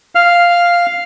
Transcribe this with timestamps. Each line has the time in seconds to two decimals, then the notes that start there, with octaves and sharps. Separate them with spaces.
0.15 F5 F6